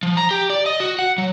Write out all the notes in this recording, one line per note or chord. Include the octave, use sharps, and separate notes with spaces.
F3
A#5
G4
D5
D#5
F#4
F#5
F#3